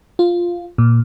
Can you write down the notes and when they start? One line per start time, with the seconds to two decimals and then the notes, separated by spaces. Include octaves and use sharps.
0.19 F4
0.78 A#2